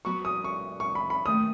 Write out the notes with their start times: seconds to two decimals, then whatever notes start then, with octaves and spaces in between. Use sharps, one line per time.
0.05 F#3 B3 F#4 B4 C#6
0.25 D#6
0.44 C#6
0.80 C#6
0.95 B5
1.10 B5
1.25 D#2 D#3 A3 C#4 D#6